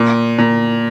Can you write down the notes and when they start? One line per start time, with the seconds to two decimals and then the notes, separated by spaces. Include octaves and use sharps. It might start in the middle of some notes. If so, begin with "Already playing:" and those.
Already playing: A#2
0.38 A#2